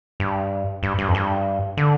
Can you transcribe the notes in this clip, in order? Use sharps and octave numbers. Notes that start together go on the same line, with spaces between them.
G2
G2
G2
F2
G2
D3